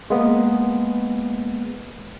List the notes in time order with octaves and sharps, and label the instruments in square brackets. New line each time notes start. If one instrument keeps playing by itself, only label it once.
[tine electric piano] G#3 A#3 B3